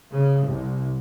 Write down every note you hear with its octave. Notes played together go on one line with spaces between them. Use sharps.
C#3
C2